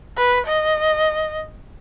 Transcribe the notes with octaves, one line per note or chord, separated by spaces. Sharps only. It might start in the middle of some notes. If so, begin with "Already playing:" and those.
B4
D#5